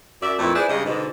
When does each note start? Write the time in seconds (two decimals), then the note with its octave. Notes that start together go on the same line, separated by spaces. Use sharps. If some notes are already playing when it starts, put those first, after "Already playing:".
0.22 F#2 D5 E5
0.39 F2 A#2 A3 E4 B4
0.55 E4 G#4 B4 C5 D5
0.69 G2 C#3 G#3 D#5
0.85 G#2 B2 D3 G#3